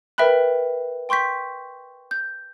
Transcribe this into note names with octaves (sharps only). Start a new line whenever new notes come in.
A#4 B4 E5 G5 B5 F#6
G5 C6 C#6 G6 B6
G6